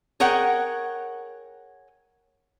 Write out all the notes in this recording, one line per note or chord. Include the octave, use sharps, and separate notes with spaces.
G#4 A#4 C#5 F#5 G5